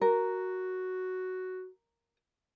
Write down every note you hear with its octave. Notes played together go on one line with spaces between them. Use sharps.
F#4 A#4